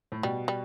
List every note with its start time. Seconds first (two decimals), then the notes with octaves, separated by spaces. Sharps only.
0.12 A2
0.23 B2 G3
0.48 G3